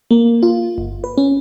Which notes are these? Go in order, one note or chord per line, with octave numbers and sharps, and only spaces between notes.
A#3
F4
G1
B4
C#4